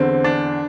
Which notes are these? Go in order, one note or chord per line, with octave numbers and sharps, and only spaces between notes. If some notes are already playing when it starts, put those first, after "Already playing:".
Already playing: E2 D3 C4
D4